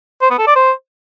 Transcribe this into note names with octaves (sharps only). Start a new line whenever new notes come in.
C5
B3
A4
D5
C5